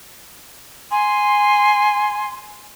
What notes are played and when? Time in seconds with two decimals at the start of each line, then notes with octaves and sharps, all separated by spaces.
0.91 G#5 C6